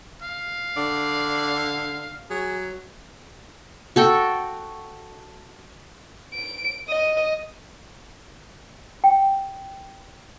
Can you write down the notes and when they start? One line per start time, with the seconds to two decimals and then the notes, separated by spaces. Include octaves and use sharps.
0.22 F5
0.77 D3 D5
2.30 F#3 G#4
3.96 F#4 A4 G5
6.34 D7
6.88 D#5
9.04 G5